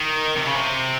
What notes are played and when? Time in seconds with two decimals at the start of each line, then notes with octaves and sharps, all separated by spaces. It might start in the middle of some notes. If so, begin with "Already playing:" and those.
Already playing: D#3
0.37 C3
0.47 C#3
0.57 C3